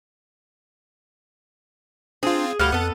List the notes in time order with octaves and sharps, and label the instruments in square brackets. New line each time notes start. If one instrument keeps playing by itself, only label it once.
[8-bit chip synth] C4 F4 [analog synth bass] D4 [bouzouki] G#4
[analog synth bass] D2 [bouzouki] A2 G3 F5 [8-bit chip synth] F#5 [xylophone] F6 G7
[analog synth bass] F2 [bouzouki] B3 A4